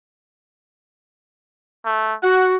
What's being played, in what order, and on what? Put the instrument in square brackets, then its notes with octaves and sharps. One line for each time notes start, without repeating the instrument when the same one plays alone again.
[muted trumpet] A3
[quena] F#4 [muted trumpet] F#5